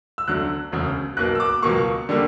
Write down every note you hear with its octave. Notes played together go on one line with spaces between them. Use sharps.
E6
D2 D3 F#3 F#6
E1 D2 C#3
B1 B2 A#3 F#6
E6
D6
C#2 B2 F#3 A#3 C#6
D3 G3 A#3